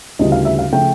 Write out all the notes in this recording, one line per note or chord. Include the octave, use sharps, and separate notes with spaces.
D2 C#3 E3 G3 D#5
F5
E5
F5
C#3 F3 A3 G5